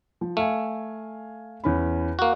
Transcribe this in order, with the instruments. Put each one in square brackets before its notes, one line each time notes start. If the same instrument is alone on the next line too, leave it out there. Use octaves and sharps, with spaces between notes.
[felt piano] F3
[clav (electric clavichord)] A3 [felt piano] F5 G#5
[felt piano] E2 C#4 B5
[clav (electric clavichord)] A#3 F#4